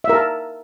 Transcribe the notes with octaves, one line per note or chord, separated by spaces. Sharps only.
E5
A#4
A5